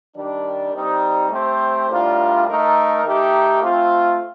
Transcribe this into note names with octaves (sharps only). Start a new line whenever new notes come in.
D#3 G3 D4
G3 C4 D#4
A3 C4 G4 C5
A2 G3 D4 F4 A#4
A3 D#4 A#4
D#3 A3 D#4 G4
A3 C4 F4